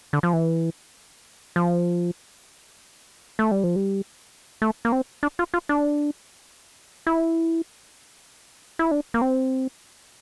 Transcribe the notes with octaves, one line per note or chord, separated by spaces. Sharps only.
D3
F3
E3
F3
A3
G3
F3
G3
A3
A#3
C4
D4
F4
F4
D4
E4
E4
D4
A#3
C4